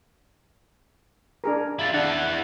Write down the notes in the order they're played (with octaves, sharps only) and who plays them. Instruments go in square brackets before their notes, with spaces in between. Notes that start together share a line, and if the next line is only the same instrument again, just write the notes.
[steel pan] D4 G#4 A#4
[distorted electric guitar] E4 F4
[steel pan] D4 [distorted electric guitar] E4 F#5